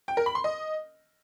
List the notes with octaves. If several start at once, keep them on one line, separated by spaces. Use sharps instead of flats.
G5
A#4
B5
C6
D#5